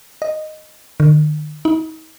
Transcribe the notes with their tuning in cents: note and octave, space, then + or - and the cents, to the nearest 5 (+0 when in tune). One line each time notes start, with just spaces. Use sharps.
D#5 -5
D#3 -45
D#4 +35